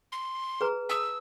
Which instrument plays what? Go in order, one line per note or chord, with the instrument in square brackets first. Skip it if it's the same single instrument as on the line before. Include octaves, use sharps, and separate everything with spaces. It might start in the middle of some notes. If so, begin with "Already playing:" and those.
[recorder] C6
[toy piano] G#4 B4 A#5
[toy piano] A5 D#6 [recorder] E6